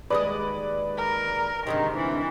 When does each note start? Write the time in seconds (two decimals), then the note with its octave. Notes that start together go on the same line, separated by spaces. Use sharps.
0.10 D#2 G#3 B4 D5 D#5
0.97 A#4
1.67 D2 G#2 C3 D#3
1.97 E3